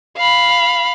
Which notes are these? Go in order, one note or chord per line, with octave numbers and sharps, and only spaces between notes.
F5 B5